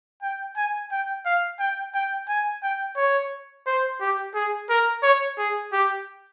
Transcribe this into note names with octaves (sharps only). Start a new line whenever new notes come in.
G5
G#5
G5
F5
G5
G5
G#5
G5
C#5
C5
G4
G#4
A#4
C#5
G#4
G4